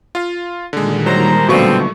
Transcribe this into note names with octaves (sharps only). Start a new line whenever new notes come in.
F4 F5
A#2 D3 D#3 G3 G#3
F#3 A#4 C5 A#5
B2 D3 F3 F#3 A3 C4 C#6